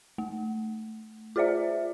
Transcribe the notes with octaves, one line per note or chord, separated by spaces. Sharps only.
A3
F4 G#4 C5 D5 E5